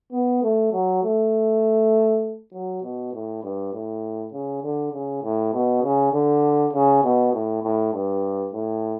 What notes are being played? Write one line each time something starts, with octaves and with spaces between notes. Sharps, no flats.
B3
A3
F#3
A3
F#3
B2
A2
G2
A2
C#3
D3
C#3
A2
B2
C#3
D3
C#3
B2
A2
A2
G2
A2